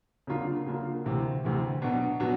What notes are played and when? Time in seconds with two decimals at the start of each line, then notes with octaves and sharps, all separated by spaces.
0.27 C#3 F#3 A#3 D4 F4
0.66 C#3 F#3 A#3 D4 F4
1.04 D2 C3 E3
1.44 D2 C3 E3
1.82 B2 F#3 B3 D4
2.20 B2 F#3 B3 D4